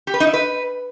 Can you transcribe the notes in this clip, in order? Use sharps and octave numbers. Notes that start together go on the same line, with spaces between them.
G4
B4
D#4
E4
B4